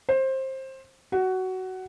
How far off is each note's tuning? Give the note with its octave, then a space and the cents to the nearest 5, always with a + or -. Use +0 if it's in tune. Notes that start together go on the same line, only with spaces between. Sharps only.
C5 +20
F#4 +15